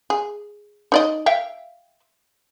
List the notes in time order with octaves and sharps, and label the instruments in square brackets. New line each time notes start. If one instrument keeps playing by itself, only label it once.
[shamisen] G#4
D#4 D5 D#5
E5 F5 G5